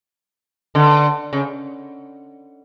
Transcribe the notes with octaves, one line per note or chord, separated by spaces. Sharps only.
D3
C#3